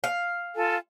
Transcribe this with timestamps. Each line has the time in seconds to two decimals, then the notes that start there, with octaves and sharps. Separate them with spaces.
0.04 F5
0.55 F4 A4 G#5